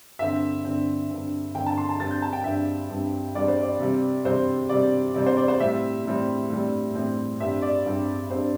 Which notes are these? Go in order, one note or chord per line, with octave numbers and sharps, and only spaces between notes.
G2 D3 C4 E5
G2 D3 C4
G2 D3 C4
G2 D3 C4 G5
A5
C6
A5
G2 G3 C4 A6
G6
A5
G5
G2 G3 C4 E5
G2 G3 C4
G2 G3 C4 D5
C5
D5
C3 G3 C4
C3 G3 C4 C5
C3 G3 C4 D5
C3 G3 C4 D5
C5
D5
C5
A2 G3 C4 E5
A2 G3 C4
A2 G3 C4
A2 G3 C4
G2 G3 C4 E5
D5
G2 G3 C4
G2 G3 C4 C5